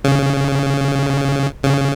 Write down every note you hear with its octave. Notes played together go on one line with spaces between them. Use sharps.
C#3
C#3